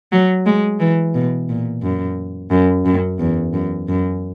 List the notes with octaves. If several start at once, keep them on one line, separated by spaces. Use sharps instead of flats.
F#3
G#3
E3
B2
A#2
F#2
F#2
F#2
E2
F#2
F#2